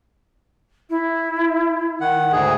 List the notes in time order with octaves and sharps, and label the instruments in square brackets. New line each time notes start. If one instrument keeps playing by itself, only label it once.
[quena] E4
[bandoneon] D#3 F#5
D2 G#2 G#4